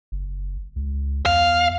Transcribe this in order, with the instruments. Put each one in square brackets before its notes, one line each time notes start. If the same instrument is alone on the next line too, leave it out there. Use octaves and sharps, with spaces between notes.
[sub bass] F#1
C#2
[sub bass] E2 [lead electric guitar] F5